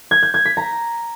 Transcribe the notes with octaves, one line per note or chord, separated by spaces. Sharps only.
G#6
G6
G#6
B6
A#5